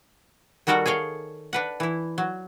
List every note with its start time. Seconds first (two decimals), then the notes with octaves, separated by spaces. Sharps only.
0.67 D#3 G3 F#4 A4 A#4 F#5
0.86 G#4 A4 C#5 F5 G5
1.53 D4 B4 F#5
1.80 E3 E4
2.18 F#3